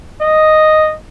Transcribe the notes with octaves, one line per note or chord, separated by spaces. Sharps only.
D#5